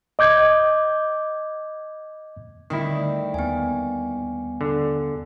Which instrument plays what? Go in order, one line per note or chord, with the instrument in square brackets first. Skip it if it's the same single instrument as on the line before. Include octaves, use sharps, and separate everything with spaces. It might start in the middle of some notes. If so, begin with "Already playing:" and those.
[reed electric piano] D#5 D6 G6 G#6
[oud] D2 G3 C4 [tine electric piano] D3 [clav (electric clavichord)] D#3 E4
[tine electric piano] D#2 [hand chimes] B3 G#5
[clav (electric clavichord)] D3